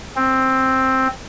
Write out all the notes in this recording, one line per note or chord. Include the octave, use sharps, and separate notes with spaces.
C4